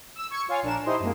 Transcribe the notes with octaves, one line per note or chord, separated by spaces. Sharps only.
E6
C#6 G#6 C#7
F4 C#5 F5 G#5
A#1 D4 A#4 E7
D#4 E4 G4 C5 D#5 C6
F#2 F#3 G#3 A#3